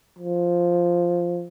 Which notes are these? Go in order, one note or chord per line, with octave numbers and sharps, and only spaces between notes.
F3